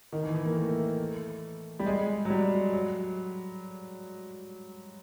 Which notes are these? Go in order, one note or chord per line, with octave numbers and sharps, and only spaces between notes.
D#3
E3
E3
A#3
A3
G3
G#3
F#3
G3
F#3